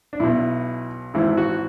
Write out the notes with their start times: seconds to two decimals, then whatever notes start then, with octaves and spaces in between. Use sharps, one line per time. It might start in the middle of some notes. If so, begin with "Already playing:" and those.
0.13 D4
0.20 B1 B2 E4
1.14 G#1 G#2 E3 E4
1.37 F#4